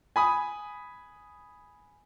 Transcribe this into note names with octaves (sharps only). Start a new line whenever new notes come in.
G#5 B5 D#6